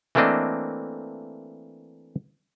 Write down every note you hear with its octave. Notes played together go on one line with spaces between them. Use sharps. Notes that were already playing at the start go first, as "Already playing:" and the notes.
E3 A3 A#3 C4 D4 D#5